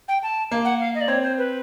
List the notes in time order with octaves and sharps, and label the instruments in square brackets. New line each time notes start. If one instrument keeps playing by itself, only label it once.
[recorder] G5
A5
[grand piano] A#3
[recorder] F#5
F5
D#5
D5
[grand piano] C4 [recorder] C#5
[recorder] C5
B4